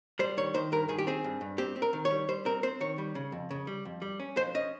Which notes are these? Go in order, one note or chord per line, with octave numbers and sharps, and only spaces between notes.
G3 C5
D#3 C#5
D#3 C5
G2 A#4
D#3 G#4
G4
C4 G#4
G2
G2
C4 G4
C4
A#4
D#3
C#5
G3
G3 C5
C4 A#4
C4 C5
D#3 C#5
G3
C#3
F2
C#3
G3
F2
G3
C#4
F2 C5
C#4 D#5